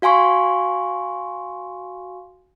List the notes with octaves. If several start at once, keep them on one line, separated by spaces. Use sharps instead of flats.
F#4 F5 G#5 C6 C#6